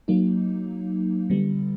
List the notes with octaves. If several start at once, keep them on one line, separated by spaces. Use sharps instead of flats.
F#3 A#3 D#4
D3 G3 B3